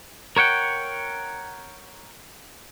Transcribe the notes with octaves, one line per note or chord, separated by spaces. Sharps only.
A#4 C#5 F#5 G5